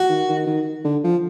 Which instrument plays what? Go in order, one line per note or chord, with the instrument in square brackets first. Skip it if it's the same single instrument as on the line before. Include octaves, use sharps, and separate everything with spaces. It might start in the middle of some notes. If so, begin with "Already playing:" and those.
Already playing: [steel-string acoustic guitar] F#4
[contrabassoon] D#3
D#3
D#3
D3
F3